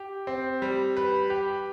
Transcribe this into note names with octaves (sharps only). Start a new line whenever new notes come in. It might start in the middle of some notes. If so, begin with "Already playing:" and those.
Already playing: G4
C4
G3
B4
G4